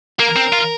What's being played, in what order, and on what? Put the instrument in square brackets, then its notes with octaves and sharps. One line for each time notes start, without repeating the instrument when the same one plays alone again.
[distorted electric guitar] A#3 [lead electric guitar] A#4
[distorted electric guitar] C4
F4